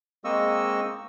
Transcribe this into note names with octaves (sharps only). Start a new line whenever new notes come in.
G#3 A#3 C4 D#5 C#6 E6